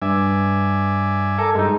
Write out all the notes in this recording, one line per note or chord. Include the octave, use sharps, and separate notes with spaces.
G2 D5 E5 G#5
A4 A#4 G#5 D6
G2 G#3 D#4